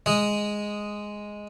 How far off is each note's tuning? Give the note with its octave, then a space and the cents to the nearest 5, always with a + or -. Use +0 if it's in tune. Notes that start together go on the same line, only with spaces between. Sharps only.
G#3 +0 D#5 +0